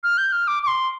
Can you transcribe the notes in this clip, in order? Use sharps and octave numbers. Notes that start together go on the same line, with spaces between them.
F6
G6
F6
D6
D6
C6